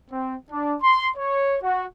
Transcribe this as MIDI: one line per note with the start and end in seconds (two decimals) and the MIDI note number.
0.11 0.35 60
0.51 0.77 62
0.82 1.09 84
1.17 1.57 73
1.63 1.86 66